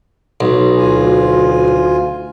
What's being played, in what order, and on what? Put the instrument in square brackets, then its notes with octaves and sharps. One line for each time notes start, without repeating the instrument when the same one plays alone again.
[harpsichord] B1
[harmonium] D2 F4 G#5